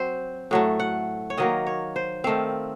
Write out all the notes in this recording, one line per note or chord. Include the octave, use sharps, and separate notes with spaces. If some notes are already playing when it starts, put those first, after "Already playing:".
Already playing: F#3 C4 C5
A2 F#3 A3
F#5
C#5
D#3 F#3 A#3 D#5
C#5
C5
D#3 A3 C4 F5